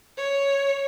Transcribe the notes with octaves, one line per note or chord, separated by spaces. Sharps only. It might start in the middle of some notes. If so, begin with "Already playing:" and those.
C#5